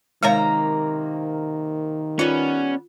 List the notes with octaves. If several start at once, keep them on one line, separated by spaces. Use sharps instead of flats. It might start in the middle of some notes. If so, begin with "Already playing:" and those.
C3 D#3 G#3 A#3 C#5 F5 A#5
G3 B3 C#4 F4